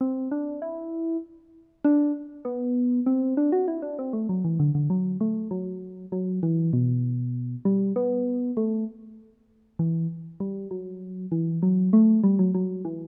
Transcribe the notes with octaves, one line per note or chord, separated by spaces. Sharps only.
C4
D4
E4
D4
B3
C4
D4
F#4
E4
D4
C4
A3
F#3
E3
D3
D3
F#3
A3
F#3
F#3
E3
B2
G3
B3
A3
E3
G3
F#3
E3
F#3
A3
G3
F#3
F#3
E3